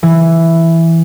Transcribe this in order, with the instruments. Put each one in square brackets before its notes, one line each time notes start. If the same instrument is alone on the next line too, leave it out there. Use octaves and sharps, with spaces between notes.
[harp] E3